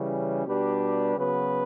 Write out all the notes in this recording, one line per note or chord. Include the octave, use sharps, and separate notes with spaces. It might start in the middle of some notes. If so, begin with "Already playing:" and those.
Already playing: C#3 E3 G3 C#4
B2 G3 D4 G4 B4
C#3 F#3 B3 F#4 B4